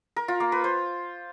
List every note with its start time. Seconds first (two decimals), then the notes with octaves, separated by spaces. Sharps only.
0.16 A#4
0.28 F4
0.40 A#3
0.52 B4
0.64 C5